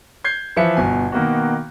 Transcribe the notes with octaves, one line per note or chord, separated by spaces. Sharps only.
G6 G#6 C7
E3 F3 B4 E5 C#7
G1 B2 G#5
B2 D#3 A#3 B3 F#4